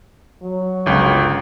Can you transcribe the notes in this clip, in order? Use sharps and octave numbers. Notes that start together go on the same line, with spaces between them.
F#3
G1 C#2